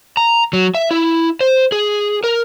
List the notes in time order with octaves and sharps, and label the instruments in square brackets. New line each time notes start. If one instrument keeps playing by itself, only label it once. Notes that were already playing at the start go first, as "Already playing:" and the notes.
[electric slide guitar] A#5
F#3
E5
E4
C5
G#4
A#4